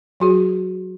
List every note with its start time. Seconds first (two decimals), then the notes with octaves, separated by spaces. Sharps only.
0.20 F#3 F#4 G#4 C#5